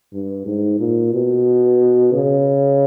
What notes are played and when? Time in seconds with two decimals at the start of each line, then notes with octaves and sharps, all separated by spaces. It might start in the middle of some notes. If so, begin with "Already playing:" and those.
0.13 G2
0.46 G#2
0.80 A#2
1.13 B2
2.13 C#3